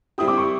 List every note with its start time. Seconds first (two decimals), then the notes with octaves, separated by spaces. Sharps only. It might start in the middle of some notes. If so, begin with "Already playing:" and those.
0.18 G3 C4 E4 G4 D#6
0.28 D6
0.37 C#6